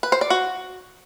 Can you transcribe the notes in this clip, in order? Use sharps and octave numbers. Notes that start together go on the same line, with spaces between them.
B4
C5
D5
F#4